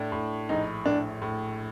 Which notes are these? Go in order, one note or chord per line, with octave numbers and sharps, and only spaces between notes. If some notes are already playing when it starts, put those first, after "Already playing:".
Already playing: A2 A3 D4
A2
A#1 D#4
A2 D4
A2